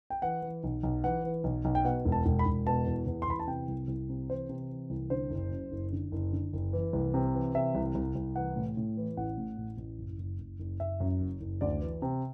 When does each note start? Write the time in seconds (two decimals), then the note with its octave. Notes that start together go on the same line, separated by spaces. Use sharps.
0.10 G5
0.22 E3 F#5
0.42 E3
0.64 B1
0.83 B1
1.04 E3 F#5
1.24 E3
1.44 B1
1.65 B1
1.75 G5
1.84 B2 F#5
2.05 E1
2.12 A5
2.26 E1
2.39 B5
2.46 E1
2.66 B2 A5
2.87 E2
3.06 E2
3.22 C6
3.28 E2 B5
3.39 A5
3.47 C3 G5
3.68 C2
3.88 C2
4.09 C3
4.29 E3 C5
4.49 C3
4.70 E3
4.90 C2
5.10 D3 C5
5.30 F#1
5.51 F#2
5.72 F#1
5.92 D3
6.12 F#1
6.32 D3
6.53 F#1
6.73 E3
6.93 C2
7.14 C3
7.34 E3
7.54 C3 E5
7.75 C2
7.95 C2
8.15 C2
8.36 E3 F#5
8.56 A2
8.77 A2
8.97 E3
9.17 A1 F#5
9.38 A2
9.58 A1
9.78 A1
9.99 F#1
10.18 F#1
10.39 F#1
10.59 F#1
10.80 F#1 E5
11.00 F#2
11.21 F#1
11.41 F#1
11.61 D2 D5
11.81 E3
12.02 C3